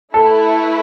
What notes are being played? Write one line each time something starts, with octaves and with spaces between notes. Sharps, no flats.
A3 E4 A4 B4